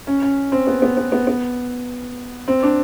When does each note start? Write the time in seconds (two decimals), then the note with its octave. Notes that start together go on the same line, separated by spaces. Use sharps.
0.07 C#4
0.22 C#4
0.52 C4
0.67 B3
0.82 B3
0.97 B3
1.12 B3
1.27 B3
2.48 C4
2.63 D4